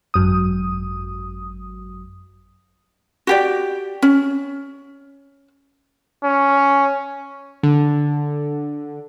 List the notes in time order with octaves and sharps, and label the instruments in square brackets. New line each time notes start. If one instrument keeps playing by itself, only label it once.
[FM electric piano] G#1 F#2 D#6
[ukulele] F#4 G4 D5
C#4
[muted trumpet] C#4
[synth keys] D3